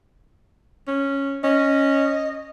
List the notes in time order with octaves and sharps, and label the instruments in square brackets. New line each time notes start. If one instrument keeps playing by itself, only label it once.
[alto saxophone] C#4
[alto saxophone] C#4 [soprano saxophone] D#5